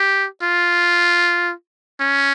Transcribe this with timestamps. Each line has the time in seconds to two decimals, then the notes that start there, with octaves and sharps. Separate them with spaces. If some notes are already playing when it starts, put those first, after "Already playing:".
Already playing: G4
0.43 F4
2.00 C#4